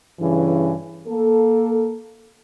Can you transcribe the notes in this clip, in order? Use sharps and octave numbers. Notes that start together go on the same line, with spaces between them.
G2 C#3 E3
A#3 A4